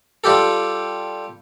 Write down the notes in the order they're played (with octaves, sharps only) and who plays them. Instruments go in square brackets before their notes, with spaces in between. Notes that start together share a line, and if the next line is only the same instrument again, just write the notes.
[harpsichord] G3 F4 G4 A4